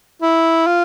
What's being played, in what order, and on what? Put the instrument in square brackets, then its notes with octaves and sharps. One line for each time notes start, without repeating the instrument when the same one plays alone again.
[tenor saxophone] E4
F4